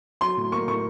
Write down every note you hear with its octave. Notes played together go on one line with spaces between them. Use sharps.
F#3 C6
A2
A#3 C#6
A2 C#6